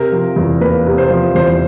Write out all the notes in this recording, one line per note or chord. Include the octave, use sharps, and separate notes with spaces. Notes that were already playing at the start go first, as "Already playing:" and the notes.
Already playing: C3 A#4
F3
E2
A#3 B4
C3
C5
F3
E2 C5